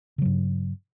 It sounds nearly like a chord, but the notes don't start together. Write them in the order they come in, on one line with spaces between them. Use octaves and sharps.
C#3 F#3 G2